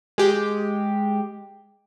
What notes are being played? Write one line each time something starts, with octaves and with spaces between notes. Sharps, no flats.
G#3 G4